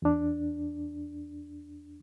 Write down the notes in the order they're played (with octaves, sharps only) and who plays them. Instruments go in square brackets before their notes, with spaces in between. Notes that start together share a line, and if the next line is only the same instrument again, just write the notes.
[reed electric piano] E2 D4